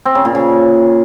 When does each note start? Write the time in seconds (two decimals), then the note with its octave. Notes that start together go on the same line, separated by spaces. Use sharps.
0.05 C4
0.15 C#3
0.25 A#2
0.35 C#3